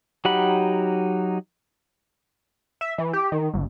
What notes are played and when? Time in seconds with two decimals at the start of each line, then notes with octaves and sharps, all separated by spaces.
0.25 F#3 D#4 G4 F#5 B5
2.81 E5
2.98 E3
3.13 G4
3.32 D#3
3.54 G1